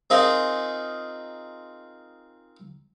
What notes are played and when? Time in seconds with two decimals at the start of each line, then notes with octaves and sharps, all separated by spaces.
0.10 C4 D#4 F4 G#4 A#4